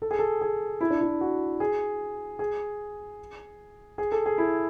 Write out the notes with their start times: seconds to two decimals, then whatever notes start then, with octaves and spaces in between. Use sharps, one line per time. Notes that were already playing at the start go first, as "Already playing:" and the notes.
0.02 A4
0.11 G#4
0.19 A4
0.41 G#4
0.81 E4
0.90 D4
1.01 E4
1.21 F#4
1.60 G#4
2.39 G#4
3.98 G#4
4.12 A4
4.26 G#4
4.38 E4